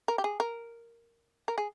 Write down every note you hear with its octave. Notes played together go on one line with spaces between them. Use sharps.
A#4
G4
G#4
A#4
A#4
G#4